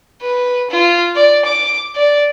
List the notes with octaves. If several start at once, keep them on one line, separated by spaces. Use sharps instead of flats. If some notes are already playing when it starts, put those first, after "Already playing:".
B4
F4
D5
D6
D5